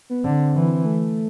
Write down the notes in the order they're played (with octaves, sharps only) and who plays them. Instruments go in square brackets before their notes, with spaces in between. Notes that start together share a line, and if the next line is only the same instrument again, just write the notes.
[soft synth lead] B3
[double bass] D3 [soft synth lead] C4
[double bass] E3
[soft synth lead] A3